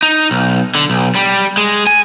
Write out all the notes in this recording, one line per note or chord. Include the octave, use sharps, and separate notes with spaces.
D#4
B1
D3
B1
G3
G#3
G#5